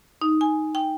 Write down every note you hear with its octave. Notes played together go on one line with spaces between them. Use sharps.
D#4
G#5
G5